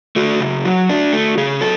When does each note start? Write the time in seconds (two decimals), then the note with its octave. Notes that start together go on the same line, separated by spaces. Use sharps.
0.16 A3 F#4
0.40 C#3
0.65 F#3
0.89 D4
1.13 A3
1.37 C#3 G#4
1.61 F#3 A4